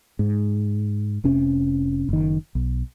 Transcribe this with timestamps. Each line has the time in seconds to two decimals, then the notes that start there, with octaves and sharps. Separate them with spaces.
0.19 G#2
1.24 F1 C3 C#4
2.09 F#1 D#3
2.55 B1